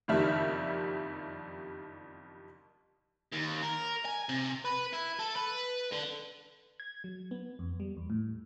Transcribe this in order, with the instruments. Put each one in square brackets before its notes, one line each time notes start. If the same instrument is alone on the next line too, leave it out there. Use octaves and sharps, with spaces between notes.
[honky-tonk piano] F#1 F2 D#3 G3 E5 F6
[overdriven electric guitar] D#2
A#4
G#5
C3
B4
E4
A4
B4
D3
[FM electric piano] G#6
F#3
B3
F2
G3
E2
A2